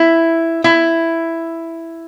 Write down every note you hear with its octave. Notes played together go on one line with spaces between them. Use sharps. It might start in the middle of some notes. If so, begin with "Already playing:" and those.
Already playing: E4
E4